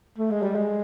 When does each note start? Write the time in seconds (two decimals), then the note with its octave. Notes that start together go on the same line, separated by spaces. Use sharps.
0.18 A3
0.31 G#3
0.42 G3
0.55 G#3